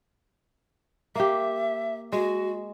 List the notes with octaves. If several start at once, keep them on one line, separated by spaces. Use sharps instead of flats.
A#3 G4 E5
G#3 F#4